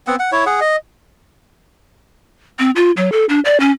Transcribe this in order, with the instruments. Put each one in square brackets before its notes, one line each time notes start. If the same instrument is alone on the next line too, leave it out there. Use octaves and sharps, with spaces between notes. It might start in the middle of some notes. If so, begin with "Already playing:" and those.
[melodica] B3 C4 F#5
F#5
E4 C#5
G#4 F#5
D#5
[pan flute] C4
F4
F#3
A4
D4
D5
C#4